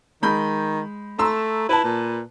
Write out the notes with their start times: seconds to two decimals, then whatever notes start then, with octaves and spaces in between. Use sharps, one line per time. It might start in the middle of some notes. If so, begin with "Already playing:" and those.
0.22 D#3 G#3 B5 G6
1.19 A3 A#5 C6 E6
1.69 E4 B4 A5
1.84 A#2